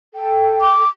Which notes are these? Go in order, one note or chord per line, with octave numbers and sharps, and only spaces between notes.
A4 G5
D6